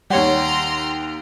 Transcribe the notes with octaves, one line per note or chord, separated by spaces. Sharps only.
D#2 G3 G4 C#5 F#5 A#5 C6